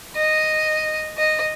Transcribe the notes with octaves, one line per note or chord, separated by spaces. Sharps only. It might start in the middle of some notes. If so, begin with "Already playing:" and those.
D#5
D#5